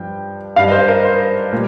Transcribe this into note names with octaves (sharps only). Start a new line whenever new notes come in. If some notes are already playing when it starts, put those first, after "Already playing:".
Already playing: G2 F3 G5
G2 G3 F5
D#5
C5
A#4
C5
A#2 G3